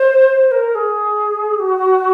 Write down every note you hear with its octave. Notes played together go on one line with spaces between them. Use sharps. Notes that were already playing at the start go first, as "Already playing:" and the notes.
Already playing: C5
C5
A#4
G#4
F#4